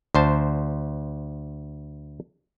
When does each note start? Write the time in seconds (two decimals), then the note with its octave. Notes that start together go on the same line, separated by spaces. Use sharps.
0.15 D2 C5 A5